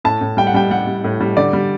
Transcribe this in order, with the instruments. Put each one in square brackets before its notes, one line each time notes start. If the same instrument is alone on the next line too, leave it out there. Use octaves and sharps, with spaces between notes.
[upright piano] A2 A5
A2
G3 G5
F#5
G3 G5
G3 F#5
G3
A2
G3
D3 D5
G3